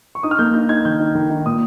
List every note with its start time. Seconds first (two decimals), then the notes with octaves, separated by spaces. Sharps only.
0.15 C#6
0.23 D#4 D#6
0.31 F6
0.39 A#3 G6
0.54 D#4 G6
0.69 D#4 G#6
0.85 D#3 G6
1.00 D#4
1.15 D#3
1.30 D#4
1.46 A#2 D#6